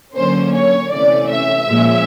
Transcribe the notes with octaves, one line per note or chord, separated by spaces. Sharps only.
D3 F#3 A#3 C#4 C5
C#5
C3 E3 A3 C#4 D5
E5
A#2 F3 G#3 C#4